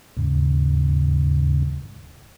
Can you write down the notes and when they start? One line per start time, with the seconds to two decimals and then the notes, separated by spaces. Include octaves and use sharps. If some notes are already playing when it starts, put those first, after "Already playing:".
0.17 D#2 G#2 C#3